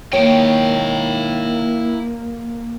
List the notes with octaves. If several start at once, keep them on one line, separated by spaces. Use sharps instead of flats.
D#3 A#3 E4 C#5 G5